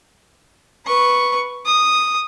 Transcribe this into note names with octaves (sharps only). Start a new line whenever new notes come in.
B4 C#6
D#6